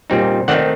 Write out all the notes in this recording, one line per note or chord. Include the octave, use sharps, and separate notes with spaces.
A#2 G3 C4 D#4
D#3 A3 C4 D#4 D5 F#5